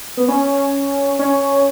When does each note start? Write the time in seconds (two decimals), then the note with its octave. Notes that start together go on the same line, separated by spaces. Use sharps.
0.17 B3
0.28 C#4
1.19 C#4